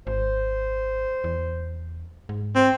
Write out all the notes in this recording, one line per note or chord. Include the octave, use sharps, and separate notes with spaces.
G#1 C5
E2
G#2
C4